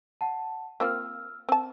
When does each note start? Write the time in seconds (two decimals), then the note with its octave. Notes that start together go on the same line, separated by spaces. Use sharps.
0.21 F#5 A5
0.80 A#3 C4 F4 E6 F6
1.49 C4 A5